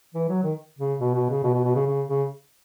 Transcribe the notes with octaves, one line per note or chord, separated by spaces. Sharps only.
E3
F#3
D#3
C#3
B2
B2
C#3
B2
B2
B2
C#3
C#3
C#3